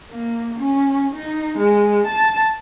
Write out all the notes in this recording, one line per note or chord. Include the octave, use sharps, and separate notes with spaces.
A#3
C#4
D#4
G#3
A5